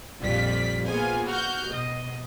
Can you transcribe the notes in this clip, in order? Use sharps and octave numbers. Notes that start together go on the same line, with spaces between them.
A#1 F2 G3 F4 D5 B6
A#3 B3 F4 G#4 C5 G#5
F#4 F6 G6
B2 D#5